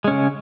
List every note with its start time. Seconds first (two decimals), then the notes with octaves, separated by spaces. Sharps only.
0.04 G#3
0.08 C#4
0.11 C#3